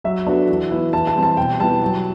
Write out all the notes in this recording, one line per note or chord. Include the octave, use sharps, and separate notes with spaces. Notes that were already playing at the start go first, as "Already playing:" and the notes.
F#3 E5
B3 D4 F#4 A4
E3
B3 E4
E3 A5
A5
G3 C4
A5
B2 G5
G3 B3 E4 A5
F#3